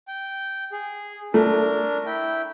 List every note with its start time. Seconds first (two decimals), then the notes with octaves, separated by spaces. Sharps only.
0.08 G5
0.72 G#4
1.34 A3 D4 A#4
2.06 E4 G5